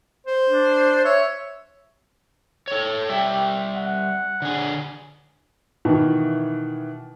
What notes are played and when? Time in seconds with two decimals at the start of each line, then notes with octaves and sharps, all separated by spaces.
0.27 C5
0.50 D4
1.05 C#5 E5
2.68 A4 C#5
3.09 G3 G4 E5
3.77 F#5
4.42 D3 G#4
5.85 B2 D#3 E3